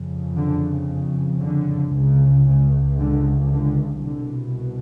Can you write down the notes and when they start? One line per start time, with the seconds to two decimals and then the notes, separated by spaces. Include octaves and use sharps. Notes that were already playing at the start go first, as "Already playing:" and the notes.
Already playing: F2 C#3
0.36 D3
1.42 D3
1.95 C#2 C#3
2.47 C#3
2.99 D3
3.52 D3
4.04 C2 B2 D3